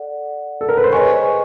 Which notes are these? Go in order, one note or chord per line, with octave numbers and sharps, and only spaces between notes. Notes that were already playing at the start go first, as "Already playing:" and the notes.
Already playing: A4 D5 F#5
A4
A#4
B4
C5
G#4 B4 C#5 D#5 G#5 C#6